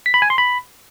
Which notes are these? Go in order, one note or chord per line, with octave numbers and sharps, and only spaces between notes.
B6
B5
G#5
C6
B5